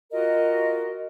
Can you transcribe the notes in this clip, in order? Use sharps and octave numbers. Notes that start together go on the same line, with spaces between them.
F4 F#4 A#4 D#5